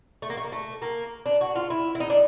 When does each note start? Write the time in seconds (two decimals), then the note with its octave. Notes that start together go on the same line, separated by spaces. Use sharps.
0.22 A3
0.30 A#3
0.37 A3
0.44 A#3
0.52 A3
0.82 A#3
1.26 D4
1.41 F#4
1.56 F4
1.70 E4
1.95 E4
2.00 D#4
2.10 D4